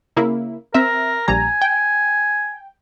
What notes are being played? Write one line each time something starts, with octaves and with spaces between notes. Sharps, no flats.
C#3 A#3 E4
C4 A#4 E5
A#1 G3 G#5 A#5
G5